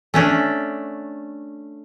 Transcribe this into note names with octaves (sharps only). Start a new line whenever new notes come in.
A3 C#4 D4